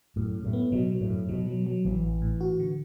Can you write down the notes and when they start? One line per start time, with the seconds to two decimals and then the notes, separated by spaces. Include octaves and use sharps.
0.16 F#2 A2
0.35 F#2
0.44 A2
0.53 B3
0.72 B2 F#3
0.91 F#3
1.01 A2
1.10 F#2
1.29 B2 F#3
1.47 F#3
1.67 F#3
1.85 A1 E3
2.03 A1
2.22 A2
2.41 F#4
2.60 D3